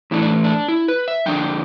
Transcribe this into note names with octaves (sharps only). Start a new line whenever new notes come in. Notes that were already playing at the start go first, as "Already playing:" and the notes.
A2 E3 A3 D4 E4
D4
D4
E4
B4
E5
F2 D3 F3 D4 G5